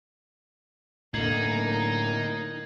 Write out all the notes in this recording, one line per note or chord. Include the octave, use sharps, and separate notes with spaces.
A2 D3 A#3 D#4 G#6 C7 F#7